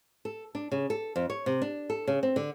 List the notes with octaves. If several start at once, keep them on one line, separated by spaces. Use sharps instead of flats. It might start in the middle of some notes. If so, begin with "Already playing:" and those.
A4
D4
C#3
A4
F2
C#5
C3
D4
A4
C#3
C4
D3